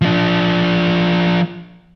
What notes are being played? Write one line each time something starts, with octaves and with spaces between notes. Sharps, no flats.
F3 D4